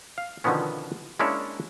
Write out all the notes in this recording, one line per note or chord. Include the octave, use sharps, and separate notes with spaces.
F5
B2 D3 D#3 F3 B3 C#4
G#3 A#3 C#4 D4 E4 C#5